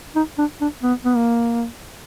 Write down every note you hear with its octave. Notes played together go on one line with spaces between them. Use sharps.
D#4
D4
D4
B3
B3
A#3